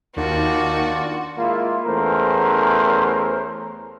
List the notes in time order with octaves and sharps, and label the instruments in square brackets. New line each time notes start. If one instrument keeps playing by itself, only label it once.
[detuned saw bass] D#2 [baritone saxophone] D#3 [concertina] D4 F4 D5 [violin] F#4
[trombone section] G#3 A#3 E4 F4
E2 A3 C#4 A#4 C5